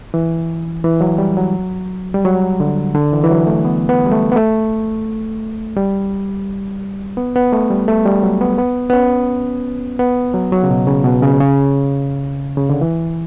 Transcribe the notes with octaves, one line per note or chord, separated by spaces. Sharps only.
E3
E3
F#3
G3
F#3
G3
F#3
D3
D3
E3
E3
F#3
A3
B3
B3
G3
A3
B3
A3
G3
B3
B3
A3
G3
A3
G3
F#3
B3
B3
B3
C#4
B3
F#3
F#3
C#3
B2
C#3
B2
C#3
C#3
C#3
D3
E3